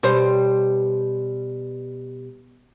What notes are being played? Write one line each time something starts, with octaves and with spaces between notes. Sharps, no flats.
B2 G3 C5